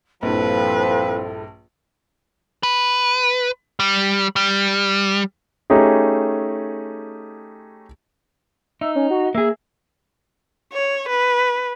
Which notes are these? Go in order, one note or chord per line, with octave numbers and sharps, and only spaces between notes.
A#1 G2 F3 C4 E4 A4 B4
B4
G3
G3
A3 C#4 D#4 G4 G#4
D#4 E5
C#4
F#4
A#3 G#4 E5
C#5
B4